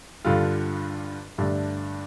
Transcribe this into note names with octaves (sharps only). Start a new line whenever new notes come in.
G2 D3 G3 F4
G2 D3 A3 D4